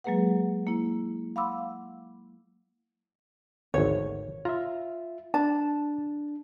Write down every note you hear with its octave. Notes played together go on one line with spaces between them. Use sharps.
F#3 G#3 A#3 G#4 B4 F#5
A#3 E4
F5 F#5 B5 C6 D6 E6
G#1 D2 C#5
F4 E5 A#5
D4 A5